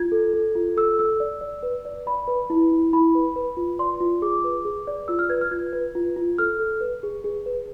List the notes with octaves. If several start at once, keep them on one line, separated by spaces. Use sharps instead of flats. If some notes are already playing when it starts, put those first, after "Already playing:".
Already playing: F4 G#6
A4
A4
F4
A4 E6
A4 E6
D5
D5
B4
D5
D5 B5
B4
E4
E4
E4 B5
B4
B4
F4
D5 C6
F4
G#4 D6
B4
G#4
D5
F4 E6
F6
B4 G#6
F6
F4 G#6
B4
F4
F4
A4 F6
A4
B4
G#4
G#4
B4